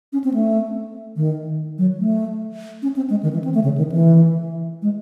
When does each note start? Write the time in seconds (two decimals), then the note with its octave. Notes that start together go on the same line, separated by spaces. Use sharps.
0.13 C#4
0.24 C4
0.34 A3
1.16 D#3
1.78 F#3
2.00 A3
2.82 C#4
2.96 C4
3.10 G#3
3.23 D#3
3.33 E3
3.44 C4
3.54 A3
3.64 C#3
3.78 D#3
3.92 E3
4.82 G#3